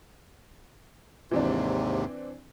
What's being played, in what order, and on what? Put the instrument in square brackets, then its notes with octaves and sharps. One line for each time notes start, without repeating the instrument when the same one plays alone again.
[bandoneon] D#2 G#2 C3 [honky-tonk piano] E3 C4 D4